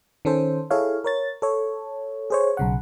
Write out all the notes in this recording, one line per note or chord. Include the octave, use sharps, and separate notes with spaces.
D#3 C#4 A4 C5
E4 G#4 A4 C#5 F5
A#4 C#5 A6
A4 C#5
G#4 C5 C#5
B1 C#3 F#5